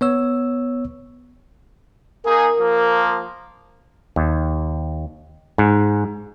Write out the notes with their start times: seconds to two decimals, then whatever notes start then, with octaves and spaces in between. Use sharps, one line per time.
0.01 B3 C#5 E6
2.25 A#3 D#4 G#4 A#4
2.58 F3 A#3
4.16 D#2
5.58 G#2